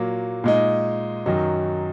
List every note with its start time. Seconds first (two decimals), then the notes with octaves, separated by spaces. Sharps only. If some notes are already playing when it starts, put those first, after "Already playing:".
Already playing: A#2 F#3 A#3
0.44 A#2 G#3 D#4
1.26 F#2 D#3 F#3 D#4